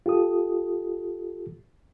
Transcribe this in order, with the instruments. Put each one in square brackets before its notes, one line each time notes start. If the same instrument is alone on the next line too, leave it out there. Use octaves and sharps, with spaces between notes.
[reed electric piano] F4 G4 A4 D#6